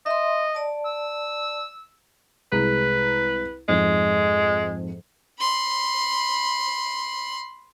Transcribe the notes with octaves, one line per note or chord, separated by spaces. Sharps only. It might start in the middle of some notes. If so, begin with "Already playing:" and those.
D#5 E5 C6
D5 A5
E6
C2 G#3 B4 A#5
F2 G#2 G#3
B5 C6